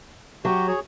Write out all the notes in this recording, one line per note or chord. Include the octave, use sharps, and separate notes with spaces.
F#3 F#4 G4
G#4 C#5